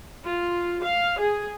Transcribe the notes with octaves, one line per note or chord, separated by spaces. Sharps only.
F4
F5
G#4